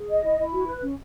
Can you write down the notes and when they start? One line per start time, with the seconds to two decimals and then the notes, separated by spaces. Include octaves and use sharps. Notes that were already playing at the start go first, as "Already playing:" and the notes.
Already playing: G#4
0.08 D#5
0.23 E4
0.38 E4
0.53 F#4
0.67 B4
0.82 C#4